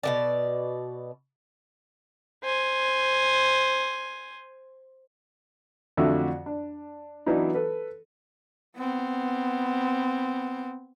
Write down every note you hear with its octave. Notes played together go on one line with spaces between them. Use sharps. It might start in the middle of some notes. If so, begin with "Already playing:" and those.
B2 D#3 D5
C5 G#5
F2 D3 A3 F#4 E5 E6
D4
E3 F#3 B3 D4 D#4
A4 B4
B3 C4